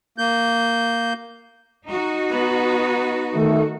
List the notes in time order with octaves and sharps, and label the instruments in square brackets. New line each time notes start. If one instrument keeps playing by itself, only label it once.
[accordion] A#3 G6
[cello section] D#4 F#4
[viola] B3
[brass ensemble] D#3 A3